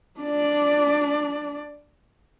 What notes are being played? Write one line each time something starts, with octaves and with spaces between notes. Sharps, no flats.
D4 D5